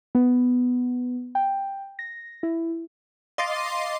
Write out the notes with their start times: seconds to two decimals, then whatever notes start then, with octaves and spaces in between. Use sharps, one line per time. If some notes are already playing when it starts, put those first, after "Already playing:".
0.15 B3
1.35 G5
1.99 A#6
2.43 E4
3.38 D#5 F5 C6 D6 A6 C7